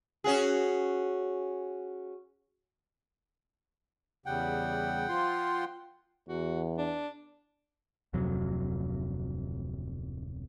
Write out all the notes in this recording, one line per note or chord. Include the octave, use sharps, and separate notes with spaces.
C#4 F#4 G#4
E2 C#3 G3 F#5 G5
F3 F4 C6
E2 F#4
D4
D1 F2 C3 F#3